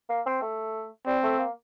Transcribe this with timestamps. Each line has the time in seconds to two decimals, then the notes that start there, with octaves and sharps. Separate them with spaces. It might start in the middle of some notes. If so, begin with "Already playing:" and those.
0.09 A#3
0.26 C4
0.42 A3
1.06 G3 C4
1.23 A3
1.39 A#3